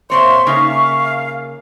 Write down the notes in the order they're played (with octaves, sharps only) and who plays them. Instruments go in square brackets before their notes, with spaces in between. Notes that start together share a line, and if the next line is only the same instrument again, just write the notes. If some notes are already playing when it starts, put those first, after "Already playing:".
[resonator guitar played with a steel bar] A#2 C4 C#5 [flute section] E5 C#6 [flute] C6
[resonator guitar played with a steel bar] C#3 A#3 D#4 [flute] F5